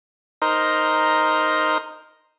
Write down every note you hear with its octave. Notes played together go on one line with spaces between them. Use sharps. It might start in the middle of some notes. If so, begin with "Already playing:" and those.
D#4 A#4 C5